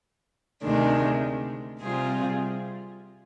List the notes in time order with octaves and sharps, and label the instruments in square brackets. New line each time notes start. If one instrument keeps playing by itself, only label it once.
[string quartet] D2 C3 D#3 G#3 D4
C3 G3 C4 F4 G#4